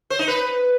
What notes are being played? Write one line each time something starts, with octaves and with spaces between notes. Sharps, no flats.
C5
D#4
B4